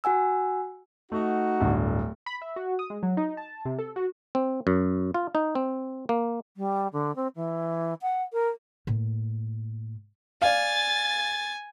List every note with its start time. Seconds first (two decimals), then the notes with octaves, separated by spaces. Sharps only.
0.04 F#4 F#5 G#5 E6
1.12 A3 D#4 F#4
1.60 D1 G1 D3
2.26 B5
2.42 E5
2.56 F#4
2.79 D#6
2.90 G#3
3.03 F#3
3.17 D#4
3.37 A5
3.65 C3
3.79 A4
3.96 F#4
4.35 C4
4.67 F#2
5.14 F4
5.35 D#4
5.55 C4
6.09 A#3
6.57 G3
6.93 D3
7.15 C4
7.36 E3
8.02 F#5
8.33 A#4
8.87 A2 A#3
10.42 D5 F5 G#5 A6